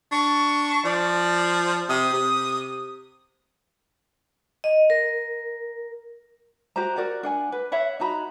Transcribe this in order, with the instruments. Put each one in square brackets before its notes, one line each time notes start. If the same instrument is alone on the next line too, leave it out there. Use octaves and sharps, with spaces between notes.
[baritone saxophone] D4 [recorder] C#6
[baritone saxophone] F3 [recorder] D5
[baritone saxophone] C3 [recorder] D#6
[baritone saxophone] C3
[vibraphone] D#5
A#4
[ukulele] F#4 G4 C5 A#5
F#4 A#4 D5 F#5
D4 F#5 G#5
B4
C#5 E5 F#5 B5
D#4 F#4 A#5 B5